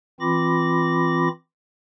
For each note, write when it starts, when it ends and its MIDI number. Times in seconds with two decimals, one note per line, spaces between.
0.21 1.29 52
0.21 1.29 60
0.21 1.29 65
0.21 1.29 83
0.21 1.29 86
0.21 1.29 94